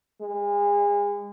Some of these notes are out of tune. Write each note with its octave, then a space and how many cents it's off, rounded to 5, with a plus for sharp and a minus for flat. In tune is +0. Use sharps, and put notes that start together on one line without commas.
G#3 -35